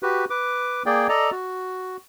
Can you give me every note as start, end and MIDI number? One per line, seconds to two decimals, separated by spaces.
0.03 0.25 66
0.03 0.25 67
0.03 0.25 71
0.30 0.83 71
0.30 0.83 86
0.86 1.07 58
0.86 1.07 68
0.86 1.07 74
0.86 1.07 79
1.09 1.31 69
1.09 1.31 74
1.09 1.31 75
1.09 1.31 82
1.32 1.97 66